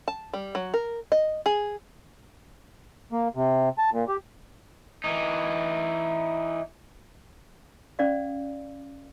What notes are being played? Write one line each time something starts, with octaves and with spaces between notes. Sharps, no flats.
A5
G3
F#3
A#4
D#5
G#4
A#3
C3
A5
A#2
G4
E3 D#4
C#4 D5 F5